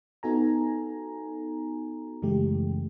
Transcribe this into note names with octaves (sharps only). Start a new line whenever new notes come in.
B3 D#4 F#4 A4 G#5 A#5
F#2 C#3 E3 G#3 A3 G4